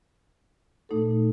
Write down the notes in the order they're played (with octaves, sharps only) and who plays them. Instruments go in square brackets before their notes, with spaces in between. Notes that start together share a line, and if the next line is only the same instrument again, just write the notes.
[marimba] A#2 A3 D#4 A4